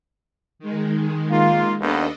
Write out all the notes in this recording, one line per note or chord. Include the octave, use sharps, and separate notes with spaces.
D#3 G#3
A#3 F4
D#2 B3 D4 A4 D#5